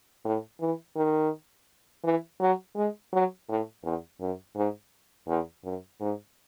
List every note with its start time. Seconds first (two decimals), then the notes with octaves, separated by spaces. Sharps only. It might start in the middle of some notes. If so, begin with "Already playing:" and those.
0.25 A2
0.61 E3
0.96 D#3
2.04 E3
2.40 F#3
2.76 G#3
3.13 F#3
3.49 A2
3.83 E2
4.20 F#2
4.56 G#2
5.28 E2
5.64 F#2
6.00 G#2